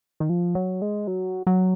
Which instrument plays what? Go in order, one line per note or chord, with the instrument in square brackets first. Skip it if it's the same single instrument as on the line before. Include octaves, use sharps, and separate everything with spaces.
[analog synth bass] D#3
F3
F#3
G#3
F#3
F#3